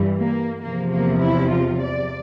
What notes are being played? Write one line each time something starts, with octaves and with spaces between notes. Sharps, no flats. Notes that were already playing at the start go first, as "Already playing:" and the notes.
Already playing: G2 E3 G3
A#3
E2 C3 F3 A#3
A#3
E4
F4
D5